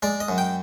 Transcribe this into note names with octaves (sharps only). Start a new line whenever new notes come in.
G#3 D5
D#5
F#2
G5